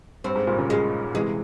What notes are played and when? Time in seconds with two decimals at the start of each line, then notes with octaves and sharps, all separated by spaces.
0.24 G2 C4
0.35 G#2
0.47 G2 A#2
0.58 A#2 C#3
0.70 G#3
1.14 C3 E3 G#3